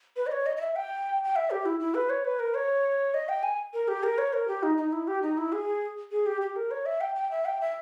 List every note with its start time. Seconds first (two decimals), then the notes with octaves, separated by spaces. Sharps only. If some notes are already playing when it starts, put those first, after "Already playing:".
0.16 B4
0.27 D#5
0.32 C#5
0.46 D#5
0.57 D#5
0.61 E5
0.76 G5
1.24 G5
1.36 E5
1.51 G4
1.66 E4
1.80 E4
1.95 B4
2.10 C#5
2.25 B4
2.40 A#4
2.54 C#5
3.14 D#5
3.29 G5
3.43 G#5
3.74 A#4
3.88 G4
4.03 A#4
4.18 C#5
4.33 A#4
4.48 G4
4.63 D#4
4.77 D#4
4.93 E4
5.08 G4
5.22 D#4
5.38 E4
5.52 G#4
6.11 G#4
6.26 G4
6.41 G4
6.56 A#4
6.71 C#5
6.86 E5
7.01 G5
7.15 G5
7.31 E5
7.45 G5
7.61 E5